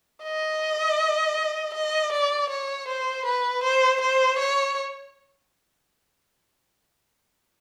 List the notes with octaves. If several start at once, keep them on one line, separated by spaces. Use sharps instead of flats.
D#5
D#5
D5
C#5
C5
B4
C5
C5
C#5